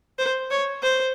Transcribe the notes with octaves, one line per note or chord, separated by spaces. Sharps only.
C5
C#5
C5